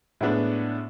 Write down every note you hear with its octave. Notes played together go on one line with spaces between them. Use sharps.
A2 G#3 B3 D4